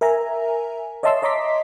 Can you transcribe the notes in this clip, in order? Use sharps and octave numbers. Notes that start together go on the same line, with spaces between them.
A#4 E5 G#5 A#5
C#5 D#5 E5 A5 C6 E6
C#5 D#5 A#5 C6 D6 B6